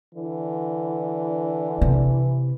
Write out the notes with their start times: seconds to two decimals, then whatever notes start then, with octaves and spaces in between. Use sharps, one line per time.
0.15 D3 E3
1.82 C3